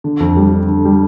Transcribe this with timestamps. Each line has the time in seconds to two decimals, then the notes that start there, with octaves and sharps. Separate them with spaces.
0.04 D3
0.20 F2
0.37 G3
0.52 D3
0.68 D3
0.85 G3